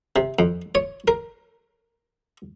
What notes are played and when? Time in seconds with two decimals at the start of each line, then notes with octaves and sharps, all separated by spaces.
0.16 C3
0.39 F2
0.75 C#5
1.08 A#4